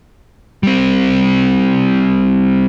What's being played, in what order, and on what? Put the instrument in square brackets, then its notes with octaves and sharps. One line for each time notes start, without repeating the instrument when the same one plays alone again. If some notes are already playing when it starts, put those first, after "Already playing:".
[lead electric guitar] G3 C4